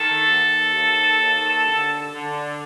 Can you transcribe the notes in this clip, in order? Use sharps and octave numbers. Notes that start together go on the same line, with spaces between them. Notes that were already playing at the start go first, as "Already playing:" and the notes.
Already playing: D#3 A4
D#2
D#2
D#2
D3
D3